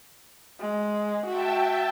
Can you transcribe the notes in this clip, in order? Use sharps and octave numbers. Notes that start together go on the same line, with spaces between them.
G#3
F#4 E5 G5 A5